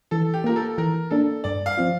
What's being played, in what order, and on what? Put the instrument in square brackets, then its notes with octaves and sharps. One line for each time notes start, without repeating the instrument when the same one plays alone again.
[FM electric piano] E3 [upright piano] A4
[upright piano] G4
[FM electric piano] A#3 F4 [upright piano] A#4
[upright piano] A4
[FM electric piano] E3 [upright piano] A#4
[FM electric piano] A#3 D4 [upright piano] A4
[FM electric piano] G2 [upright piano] D5
[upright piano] F5
[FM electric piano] F3 C4 F4